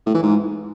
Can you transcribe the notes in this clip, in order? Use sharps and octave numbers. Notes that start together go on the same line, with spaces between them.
A2
E3
G#2